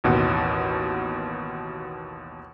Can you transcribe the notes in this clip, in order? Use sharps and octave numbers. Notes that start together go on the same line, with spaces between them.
A1 D#2 B2 F#5